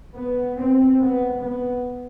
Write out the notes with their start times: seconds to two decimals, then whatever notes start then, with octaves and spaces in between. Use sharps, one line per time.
0.15 B3
0.57 C4
1.01 B3
1.43 B3